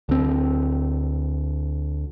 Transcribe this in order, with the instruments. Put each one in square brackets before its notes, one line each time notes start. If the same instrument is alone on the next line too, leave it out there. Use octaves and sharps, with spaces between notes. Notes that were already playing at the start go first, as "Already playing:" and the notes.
[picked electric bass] D2 C4